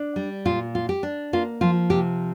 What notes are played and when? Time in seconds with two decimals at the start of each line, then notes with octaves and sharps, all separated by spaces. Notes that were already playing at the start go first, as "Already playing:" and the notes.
Already playing: D4
0.16 G3
0.45 A#2 F4
0.75 F4
0.89 G4
1.03 D4
1.33 A#3 F4
1.61 F3 F4
1.90 C3 G4